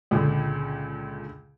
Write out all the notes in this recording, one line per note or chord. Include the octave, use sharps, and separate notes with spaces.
C#2 A#2 D3